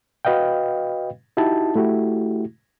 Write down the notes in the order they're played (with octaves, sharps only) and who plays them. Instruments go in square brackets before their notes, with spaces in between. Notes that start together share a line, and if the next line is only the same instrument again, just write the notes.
[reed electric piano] F#4 B4 D#5 F5 G5
D#4 E4 F#4 G4 A5
A3 E4 F#4 G4